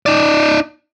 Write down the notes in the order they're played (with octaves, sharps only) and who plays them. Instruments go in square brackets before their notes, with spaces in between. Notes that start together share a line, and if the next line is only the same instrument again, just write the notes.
[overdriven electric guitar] D#4 D5